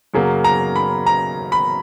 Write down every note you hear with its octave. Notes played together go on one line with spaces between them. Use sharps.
F#2 C#3 F#3 A#3
A#5
B5
A#5
B5